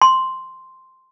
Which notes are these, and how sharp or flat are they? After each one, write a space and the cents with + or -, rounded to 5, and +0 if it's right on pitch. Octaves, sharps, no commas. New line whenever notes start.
C6 +0